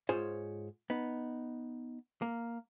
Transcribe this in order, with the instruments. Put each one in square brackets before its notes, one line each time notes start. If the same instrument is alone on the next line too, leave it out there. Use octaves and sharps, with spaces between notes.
[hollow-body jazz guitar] G#2 F4 G#4 C5 C#5
B3 D#4
A#3